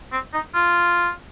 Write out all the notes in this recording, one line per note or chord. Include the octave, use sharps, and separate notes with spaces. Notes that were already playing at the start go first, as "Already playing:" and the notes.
C4
D#4
F4